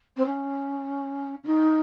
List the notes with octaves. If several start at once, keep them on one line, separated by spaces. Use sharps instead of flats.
C4
C#4
C#4
D#4